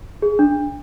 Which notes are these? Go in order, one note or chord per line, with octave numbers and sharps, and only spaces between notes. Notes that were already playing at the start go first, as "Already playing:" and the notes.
G#4
D4